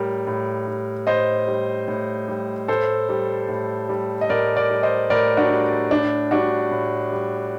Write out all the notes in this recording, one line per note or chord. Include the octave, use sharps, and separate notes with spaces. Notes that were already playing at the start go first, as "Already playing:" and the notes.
Already playing: A2 G3 A#4
A2
G3
A2 C5 D#5
G3
A2
G3
A2 A4 C5
G3
A2
G3
D#5
A2 A#4 D5
A#4 D5
G3
C5 D#5
A2 A#4 D5
D4 F#4
G3
A2 D4
G3 D4 F#4
A2
G3